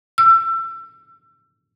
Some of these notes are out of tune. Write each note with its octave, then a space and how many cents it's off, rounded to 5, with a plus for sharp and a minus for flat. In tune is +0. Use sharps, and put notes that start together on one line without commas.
E6 +30